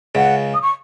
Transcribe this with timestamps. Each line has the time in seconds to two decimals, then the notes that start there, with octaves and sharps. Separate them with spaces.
0.15 C#2 C#3 F#5
0.54 D#6
0.62 C#6